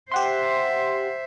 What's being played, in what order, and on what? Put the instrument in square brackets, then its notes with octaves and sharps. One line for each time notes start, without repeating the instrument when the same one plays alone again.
[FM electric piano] G4 F#5 C6 [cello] C5 E5